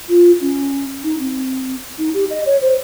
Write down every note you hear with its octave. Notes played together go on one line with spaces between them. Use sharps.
F4
C#4
D#4
C4
D#4
G4
D#5
C#5
C5